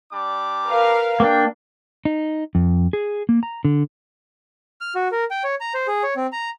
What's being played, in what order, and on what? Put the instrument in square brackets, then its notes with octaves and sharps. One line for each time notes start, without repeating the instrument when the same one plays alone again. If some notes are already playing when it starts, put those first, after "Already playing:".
[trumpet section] G3 D4 D6
[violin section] A#4 B4 F5
[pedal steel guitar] A#3 D4 [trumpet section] G5
[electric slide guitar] D#4
F2
G#4
A#3
A#5
D3
[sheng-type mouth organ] F6
F#4
A#4
G5
C#5
A#5
C5
G#4
C#5
C4
A#5